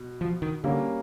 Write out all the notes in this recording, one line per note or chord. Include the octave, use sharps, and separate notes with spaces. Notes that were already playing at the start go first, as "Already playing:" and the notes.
Already playing: B2
F3
D#3
D3 G3 A#3 C#4